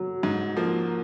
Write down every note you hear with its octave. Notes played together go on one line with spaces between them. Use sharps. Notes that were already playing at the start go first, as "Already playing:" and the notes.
Already playing: F#3
G#2
F3 A#3